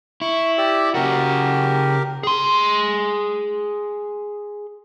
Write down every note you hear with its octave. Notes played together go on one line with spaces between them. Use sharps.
E4 C#6
G4 D5 E5
C#3 F#4 G4 A#4
G#4 C6